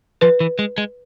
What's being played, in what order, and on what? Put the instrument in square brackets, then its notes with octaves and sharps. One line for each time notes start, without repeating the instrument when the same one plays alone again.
[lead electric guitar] F3 [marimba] B4
[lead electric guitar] E3
G#3
G#3